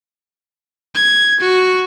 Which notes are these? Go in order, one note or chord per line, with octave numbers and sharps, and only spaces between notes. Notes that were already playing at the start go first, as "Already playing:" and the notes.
G#6
F#4